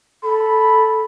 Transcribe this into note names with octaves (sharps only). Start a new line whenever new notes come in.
A4 B5